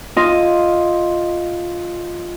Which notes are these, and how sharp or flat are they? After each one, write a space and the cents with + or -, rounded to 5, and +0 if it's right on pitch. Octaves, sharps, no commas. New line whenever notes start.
F4 +0 D#5 +0